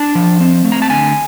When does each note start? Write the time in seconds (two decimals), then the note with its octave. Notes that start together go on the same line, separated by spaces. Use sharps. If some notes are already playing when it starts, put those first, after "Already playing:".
Already playing: D4 A5
0.15 F3
0.41 C4
0.65 A3
0.72 A#5
0.82 A5
0.90 D3 G#5